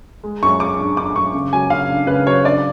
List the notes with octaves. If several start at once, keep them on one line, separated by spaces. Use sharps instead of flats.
G#3
F#2 C#6
G#3 D6
D4
D4 D6
F#2 C#6
C#3
F#3 G#5
C#3 F5
D4
C#3 B4
F#3 C#5
D4 D5